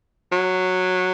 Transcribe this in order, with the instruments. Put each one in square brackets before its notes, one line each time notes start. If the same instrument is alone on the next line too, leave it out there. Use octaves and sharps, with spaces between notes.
[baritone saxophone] F#3